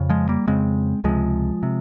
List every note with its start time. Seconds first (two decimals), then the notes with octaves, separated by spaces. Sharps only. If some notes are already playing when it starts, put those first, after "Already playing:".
Already playing: F2 C#3
0.09 F3 G#3
0.29 G3 A#3
0.47 F2 C#3 G#3 C4
1.04 C#2 C3 F3 G#3
1.63 C3